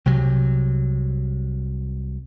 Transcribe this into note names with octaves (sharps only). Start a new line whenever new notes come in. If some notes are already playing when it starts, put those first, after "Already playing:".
C2 C3 F#3